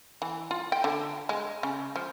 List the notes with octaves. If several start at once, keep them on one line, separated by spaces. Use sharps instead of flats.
E3
F4
G5
D3
G#3
C#3
F3